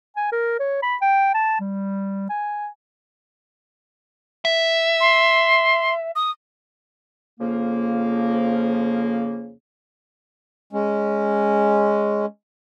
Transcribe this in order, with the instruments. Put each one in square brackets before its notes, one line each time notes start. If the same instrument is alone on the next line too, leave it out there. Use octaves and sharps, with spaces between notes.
[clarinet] G#5
A#4
C#5
B5
G5
A5
G3
G#5
[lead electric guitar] E5
[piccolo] C6
D#6
[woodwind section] F2 C#3 F3 A#3
[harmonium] G#3 C#4